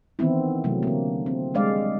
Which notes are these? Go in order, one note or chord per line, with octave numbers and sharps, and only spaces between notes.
D#3 E3 B3 C4 E4
C3 F#3 A3
D3 A#3
C4
G3 G#3 D4 D5 F5